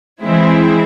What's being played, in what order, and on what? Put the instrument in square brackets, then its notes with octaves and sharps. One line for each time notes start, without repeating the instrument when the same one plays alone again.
[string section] E3 G#3 C4 E4